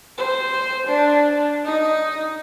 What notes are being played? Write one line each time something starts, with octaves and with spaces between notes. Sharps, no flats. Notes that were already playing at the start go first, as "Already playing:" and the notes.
C5
D4
D#4